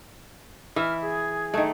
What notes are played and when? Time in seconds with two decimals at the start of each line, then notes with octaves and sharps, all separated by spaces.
0.76 E3 E5 F6
1.01 G#4
1.54 D#3 A3